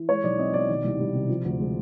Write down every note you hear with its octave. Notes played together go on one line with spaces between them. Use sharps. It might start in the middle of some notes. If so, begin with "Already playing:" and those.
Already playing: E3
G#3 C#5
B1 D5
C4 D#5
B2 D5
D#3
C2
G3
C3
F3
D2
G#3